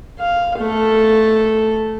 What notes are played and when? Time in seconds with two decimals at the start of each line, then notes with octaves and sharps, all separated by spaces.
0.20 F5
0.59 A3 A4